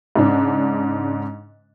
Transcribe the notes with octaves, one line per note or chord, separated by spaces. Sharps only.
G#2 C#3 D4